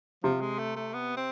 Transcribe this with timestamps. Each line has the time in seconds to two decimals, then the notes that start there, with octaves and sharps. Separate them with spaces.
0.24 C3 F3
0.41 G#3
0.59 A3
0.76 A3
0.94 B3
1.17 C4